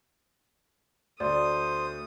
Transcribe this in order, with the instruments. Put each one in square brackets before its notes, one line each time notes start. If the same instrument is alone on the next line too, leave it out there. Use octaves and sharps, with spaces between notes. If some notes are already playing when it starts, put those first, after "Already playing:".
[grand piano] D2 [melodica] C5 [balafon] D5 [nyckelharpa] D#6